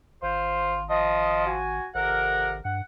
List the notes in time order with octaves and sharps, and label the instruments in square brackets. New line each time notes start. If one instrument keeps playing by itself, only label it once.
[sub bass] G#1 [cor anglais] F4 [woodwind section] C5
[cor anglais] F3 [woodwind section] D#5
[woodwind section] F#4 G#5
[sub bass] G#1 [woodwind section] F2 C3 A#4 [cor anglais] F#5
[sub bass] G2 [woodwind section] F#5